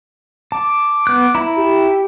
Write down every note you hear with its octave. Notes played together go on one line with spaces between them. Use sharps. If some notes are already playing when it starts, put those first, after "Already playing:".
A5 D6
B3 F#6
E4 A#5 B5
G4